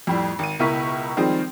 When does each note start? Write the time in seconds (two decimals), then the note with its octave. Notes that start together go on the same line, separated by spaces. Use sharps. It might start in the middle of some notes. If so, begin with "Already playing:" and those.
0.07 F2 A2 G3
0.39 G#1 D#7
0.59 C#2 B2 E4 A#4 C#6 B6
1.17 D#3 F3 G3 G#3 C4 D#4